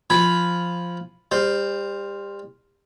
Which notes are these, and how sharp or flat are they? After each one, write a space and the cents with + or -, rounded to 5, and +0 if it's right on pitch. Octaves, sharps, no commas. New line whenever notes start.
F3 +0 G#5 +0 B5 +0
G3 +30 C5 +0